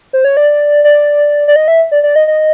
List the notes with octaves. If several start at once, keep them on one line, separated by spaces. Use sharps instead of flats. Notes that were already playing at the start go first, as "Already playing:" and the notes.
C5
C#5
D5
D5
D5
D#5
E5
D5
D5
D#5
D#5